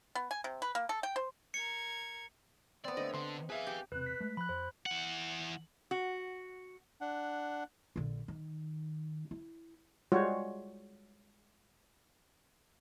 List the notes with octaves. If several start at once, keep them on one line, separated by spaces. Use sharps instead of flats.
B3
G#5
C3
B4
A#3
A4
G5
C5
A#4 G#6 C#7
B3 C4 D5
D3 A3 D#5
D3 C6
G#4 B4 E5 F5 G#5
G4
E1 C3 B4 F#6
B6
G#3 A3
F3 B5 F#6
F2 C5
E3 F#5
F#4
D4 F#5
A#1 D3
D#3
E4
G3 G#3 F4 F#4 C5 C#5